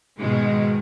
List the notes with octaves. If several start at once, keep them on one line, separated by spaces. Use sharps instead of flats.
G#2 B2 D#3 G#3